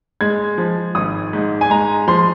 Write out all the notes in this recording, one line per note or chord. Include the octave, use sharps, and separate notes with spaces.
G#3 G#6
F3
G#1 D#6
G#2
G#5
G#3 A#5
F3 C6